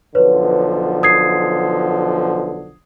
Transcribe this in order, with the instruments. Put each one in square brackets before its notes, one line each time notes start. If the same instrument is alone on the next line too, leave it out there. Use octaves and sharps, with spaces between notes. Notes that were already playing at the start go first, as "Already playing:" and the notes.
[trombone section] B1 D3 F3 [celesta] B4 C#5
[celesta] D#6 G#6 C7